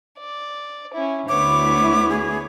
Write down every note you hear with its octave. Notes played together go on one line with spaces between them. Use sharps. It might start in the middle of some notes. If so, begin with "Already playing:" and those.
D5
C#4 E4
D2 B3 E4 C#5 D6
G#4